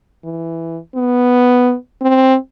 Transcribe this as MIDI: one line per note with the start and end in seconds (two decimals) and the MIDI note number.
0.24 0.78 52
0.95 1.74 59
2.01 2.35 60